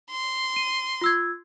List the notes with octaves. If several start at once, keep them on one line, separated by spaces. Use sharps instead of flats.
C6
D#7
F4 E6 G#6